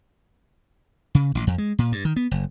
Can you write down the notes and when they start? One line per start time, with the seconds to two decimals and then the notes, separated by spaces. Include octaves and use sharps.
1.15 C#3
1.35 A1
1.47 F2
1.58 G#3
1.79 A#2
1.92 G2
2.05 D#3
2.16 B3
2.31 F#1